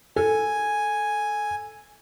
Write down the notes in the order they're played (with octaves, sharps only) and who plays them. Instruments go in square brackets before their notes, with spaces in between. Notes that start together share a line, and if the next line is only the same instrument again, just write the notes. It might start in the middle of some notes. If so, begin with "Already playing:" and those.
[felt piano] A4 [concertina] G#5